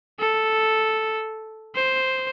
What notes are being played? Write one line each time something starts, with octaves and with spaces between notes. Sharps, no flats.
A4
C5